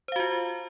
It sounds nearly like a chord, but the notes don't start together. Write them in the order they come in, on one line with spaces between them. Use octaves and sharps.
C5 F5 F#4 F4